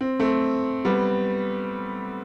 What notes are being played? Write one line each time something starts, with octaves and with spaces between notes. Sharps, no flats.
C4
A3 C4
G3 B3